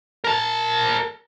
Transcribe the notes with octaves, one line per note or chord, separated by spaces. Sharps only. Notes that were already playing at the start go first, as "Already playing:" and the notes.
A#4 A5